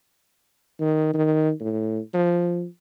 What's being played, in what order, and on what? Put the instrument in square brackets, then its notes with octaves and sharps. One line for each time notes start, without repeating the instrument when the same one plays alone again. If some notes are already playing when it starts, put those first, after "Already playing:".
[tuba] D#3
D#3
A2
F3